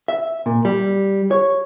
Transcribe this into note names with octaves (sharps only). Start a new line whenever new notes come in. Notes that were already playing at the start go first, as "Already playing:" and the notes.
E5
A#2
G3
C#5